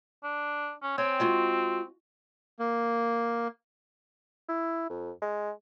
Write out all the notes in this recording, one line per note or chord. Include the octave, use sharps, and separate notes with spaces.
D4
C#4
C4 C#5 G5 G#5
G#3 F4 F#4
A#3
E4
F2
G#3